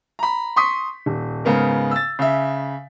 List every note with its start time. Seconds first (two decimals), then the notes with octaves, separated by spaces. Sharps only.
0.19 A#5 B5
0.56 C6 C#6 D#6 B6
1.06 D#1
1.45 G#2 C#3 B3 A#4
1.91 E6 A6
2.19 C#3 E5